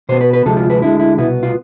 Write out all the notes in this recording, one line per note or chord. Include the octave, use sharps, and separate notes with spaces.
B2 B3 C5
B4
B4
D2 C3 F3 G#3 A4
F4
B4
D2 D3 G#3 E4
E4
C2 B2 B3 E4
F4